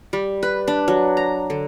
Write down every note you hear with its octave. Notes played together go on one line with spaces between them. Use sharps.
G3
B4
D4
F#3
A#5
D3